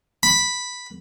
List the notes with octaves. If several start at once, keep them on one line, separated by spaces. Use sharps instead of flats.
B5